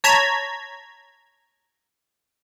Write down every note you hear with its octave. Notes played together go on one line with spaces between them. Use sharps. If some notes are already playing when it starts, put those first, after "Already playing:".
C#5 A5 A#5 G#6 B6